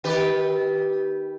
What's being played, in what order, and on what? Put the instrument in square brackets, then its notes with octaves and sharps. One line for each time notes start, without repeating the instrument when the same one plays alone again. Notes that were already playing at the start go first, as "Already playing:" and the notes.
[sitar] D#3 G4 B4